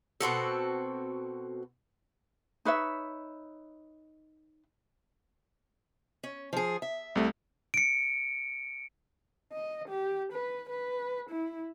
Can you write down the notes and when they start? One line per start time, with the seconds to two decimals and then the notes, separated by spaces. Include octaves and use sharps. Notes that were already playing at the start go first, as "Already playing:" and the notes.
0.21 B2 C4 F#4 A4
2.65 D#4 B4 C#5 E5
6.23 C#4
6.53 F3 G#4
6.82 E5
7.15 C2 C3 A3
7.74 C#7 D7
9.53 D#5
9.89 G4
10.33 B4
10.69 B4
11.30 E4